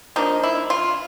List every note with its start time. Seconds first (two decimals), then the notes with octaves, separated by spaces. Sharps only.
0.16 F3 A#3 D4 D#4
0.43 E4
0.70 F4